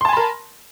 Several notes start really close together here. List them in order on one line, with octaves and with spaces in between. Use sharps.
C6 A5 G#5 B5 A#4